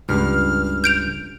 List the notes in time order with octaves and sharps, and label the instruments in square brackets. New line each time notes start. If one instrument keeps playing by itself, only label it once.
[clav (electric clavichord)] C#2 G2 [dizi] F6
[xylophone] G6 D7 F7